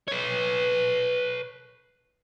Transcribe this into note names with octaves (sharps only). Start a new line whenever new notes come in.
B4 C#5